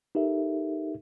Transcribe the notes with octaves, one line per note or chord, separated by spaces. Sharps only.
D#4 G4 A4 A#4 E5